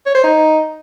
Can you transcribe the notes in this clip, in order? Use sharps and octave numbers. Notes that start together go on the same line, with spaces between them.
C#5
C5
D#4